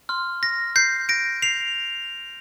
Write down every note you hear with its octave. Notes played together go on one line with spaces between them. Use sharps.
C6 F6
A#6
G6 C7
A#6 D7
C7 F7